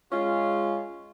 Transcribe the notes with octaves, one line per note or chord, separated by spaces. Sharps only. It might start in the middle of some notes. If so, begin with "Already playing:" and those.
G#3 C#4 F4